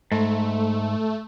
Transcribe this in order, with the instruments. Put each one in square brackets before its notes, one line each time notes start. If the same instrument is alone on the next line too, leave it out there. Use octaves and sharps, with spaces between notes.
[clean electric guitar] G#2 [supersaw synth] A3